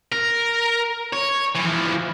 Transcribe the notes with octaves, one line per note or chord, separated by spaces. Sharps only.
A#4
C#5
E3 F3